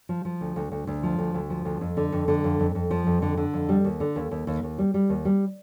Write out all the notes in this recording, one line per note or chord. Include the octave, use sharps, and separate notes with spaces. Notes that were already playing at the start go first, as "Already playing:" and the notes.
F3
F3
D2
D2
D2
D2
F3
D2
D2
F3
D2
F2
D3
F2
D3
F2
F2
F2
F3
F2
D3
D3
F2
G3
D#2
D3
D#2
D#2
D#2
D#2
G3
G3
D#2
G3